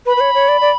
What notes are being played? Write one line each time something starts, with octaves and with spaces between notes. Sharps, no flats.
B4 B5
B4
C#5
C#5
D5
D5